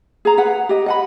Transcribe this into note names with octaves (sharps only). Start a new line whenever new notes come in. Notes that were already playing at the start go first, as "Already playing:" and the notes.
G#4 A#5
G#4 B4 F#5
G4 D#5
D#5 F#5 B5